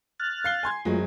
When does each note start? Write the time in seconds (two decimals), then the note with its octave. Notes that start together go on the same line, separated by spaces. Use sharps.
0.20 F6 F#6 A6
0.44 F5 C7 G7
0.63 G#5 C6 G#6
0.85 F#1 F#3 G#3 A3 F4